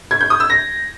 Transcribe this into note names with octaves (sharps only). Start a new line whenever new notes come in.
G#6
G6
D#6
E6
A#6